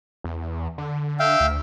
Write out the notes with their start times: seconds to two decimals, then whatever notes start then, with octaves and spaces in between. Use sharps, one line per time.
0.24 E2
0.78 D3
1.20 E5 F5 G5
1.40 D2